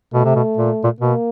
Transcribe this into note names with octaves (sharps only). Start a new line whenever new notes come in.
B2 A3
C3
B2
A#2
A#2
B2 A#3